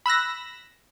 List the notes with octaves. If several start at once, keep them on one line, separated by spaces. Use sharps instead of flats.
B5 E6 F#6 A#6